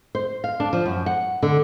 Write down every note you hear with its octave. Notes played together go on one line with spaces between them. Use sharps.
C5
F5
D4
F3
F#2
F#5
D3